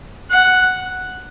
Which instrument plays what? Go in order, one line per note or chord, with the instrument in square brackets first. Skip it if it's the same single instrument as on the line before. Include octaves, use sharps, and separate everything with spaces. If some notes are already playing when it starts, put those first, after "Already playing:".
[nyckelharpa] F#5